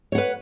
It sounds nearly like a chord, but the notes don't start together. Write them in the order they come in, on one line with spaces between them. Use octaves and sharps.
C#5 F#5 B4